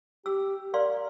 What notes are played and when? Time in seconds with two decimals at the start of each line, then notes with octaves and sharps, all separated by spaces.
0.26 G4 E6
0.74 A#4 D5 F5 C6